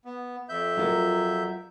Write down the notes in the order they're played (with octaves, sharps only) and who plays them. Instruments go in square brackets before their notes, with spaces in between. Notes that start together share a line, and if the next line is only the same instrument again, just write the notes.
[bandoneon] B3
F2 E5 G6
[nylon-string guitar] F#3 F4 A#4